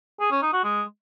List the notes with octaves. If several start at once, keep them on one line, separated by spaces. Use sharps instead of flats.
G#4
C#4
D#4
F#4
G#3